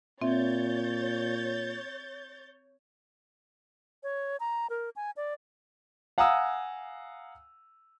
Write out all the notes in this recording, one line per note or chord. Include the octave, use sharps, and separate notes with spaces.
A#2 C4 C#5 E5 G6 A6
C#5
A#5
A#4
G#5
D5
F5 F#5 G#5 A#5 D#6 E6